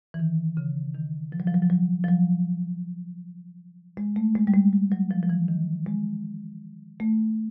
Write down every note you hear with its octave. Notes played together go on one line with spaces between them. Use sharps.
E3
D#3
C#3
D#3
F3
F#3
F3
F#3
F3
F#3
F3
F#3
G#3
A3
G#3
G3
G#3
G3
F#3
F3
F3
E3
D#3
G#3
A3